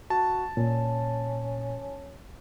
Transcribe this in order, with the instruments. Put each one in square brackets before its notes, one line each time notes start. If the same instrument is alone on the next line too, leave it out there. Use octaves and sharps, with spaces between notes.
[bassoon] F#4 [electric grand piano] A5
[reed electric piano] A#2 [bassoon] C#4